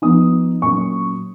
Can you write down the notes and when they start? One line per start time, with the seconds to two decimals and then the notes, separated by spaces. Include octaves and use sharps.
0.02 F3 B3 D#4 D#6
0.62 A#2 F#3 C#4 C#6